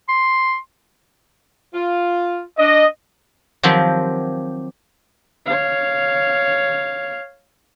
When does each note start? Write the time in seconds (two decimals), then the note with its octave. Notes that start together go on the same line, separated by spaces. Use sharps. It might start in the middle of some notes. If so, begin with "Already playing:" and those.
0.09 C6
1.73 F4
2.58 D4 D#5
3.63 D#3 F3 F#3 C4 G4
5.46 C#5 F5